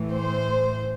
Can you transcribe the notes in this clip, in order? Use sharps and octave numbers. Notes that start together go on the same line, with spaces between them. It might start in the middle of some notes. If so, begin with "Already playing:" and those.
Already playing: A2 E3
C5